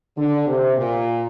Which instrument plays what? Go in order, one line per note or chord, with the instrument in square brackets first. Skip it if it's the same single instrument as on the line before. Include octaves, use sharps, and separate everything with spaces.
[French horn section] D3
C3
A#2